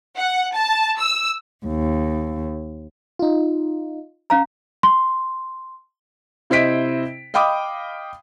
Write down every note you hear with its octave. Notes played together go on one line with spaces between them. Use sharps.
F#5
A5
E6
D#2
D#4 F4
C#4 F5 A#5
C6
C3 E4 C5 D#5 B6 D7
D#5 F5 G5 B5 D6 D#6